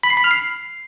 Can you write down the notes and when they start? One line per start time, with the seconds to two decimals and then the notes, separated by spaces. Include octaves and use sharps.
0.03 B5
0.10 C7
0.17 B5
0.24 F6
0.31 C7